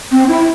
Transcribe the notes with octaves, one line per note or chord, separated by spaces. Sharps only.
C4
E4